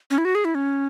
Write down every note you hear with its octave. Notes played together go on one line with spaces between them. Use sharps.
C#4
E4
F#4
G#4
E4
C#4